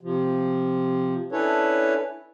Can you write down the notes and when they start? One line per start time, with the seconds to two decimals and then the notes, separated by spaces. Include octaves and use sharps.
0.01 C3 F3
1.32 C#4 D4 E4 A4 B4 C#5